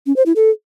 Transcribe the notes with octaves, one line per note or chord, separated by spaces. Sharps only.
C#4
C5
E4
A4